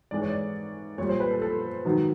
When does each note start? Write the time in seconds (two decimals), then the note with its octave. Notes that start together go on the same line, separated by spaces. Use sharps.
0.11 G#2 E3 G#3 D5
0.22 C#5
0.30 D5
0.98 A#2 C#5
1.01 G3
1.09 C5
1.20 B4
1.31 A4
1.42 A4
1.85 G#2 D#3 F#3